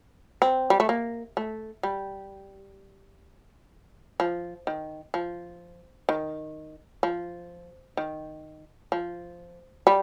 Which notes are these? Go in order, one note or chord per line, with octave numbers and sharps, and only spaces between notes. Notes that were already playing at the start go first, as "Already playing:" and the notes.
C4
G3
A3
A#3
A3
G3
F3
D#3
F3
D#3
F3
D#3
F3
G3